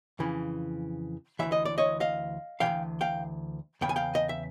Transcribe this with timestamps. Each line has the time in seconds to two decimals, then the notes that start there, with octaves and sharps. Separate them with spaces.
0.19 F2 C#3 E3
1.39 D2 C3 E3 E5
1.52 D#5
1.65 D5
1.78 C#5 D#5
2.00 D#5 F5
2.60 C3 E3 F5 G5
2.66 D2
3.01 F5 G5
3.81 E2 C#3 G5
3.89 G#5
3.96 F5 G5
4.15 D#5
4.29 E5